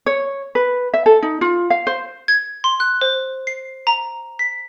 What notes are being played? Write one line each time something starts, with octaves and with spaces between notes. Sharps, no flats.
C#5
B4
E5
A4
D#4
F4
F5
C5
G#6
C6
F#6
C5
C7
A#5
B6